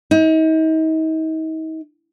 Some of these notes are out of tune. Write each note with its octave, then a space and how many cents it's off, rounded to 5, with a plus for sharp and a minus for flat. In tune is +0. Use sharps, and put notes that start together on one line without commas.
D#4 +40